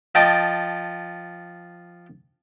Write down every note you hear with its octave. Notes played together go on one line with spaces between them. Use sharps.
F3 D#5 G5 A5 D6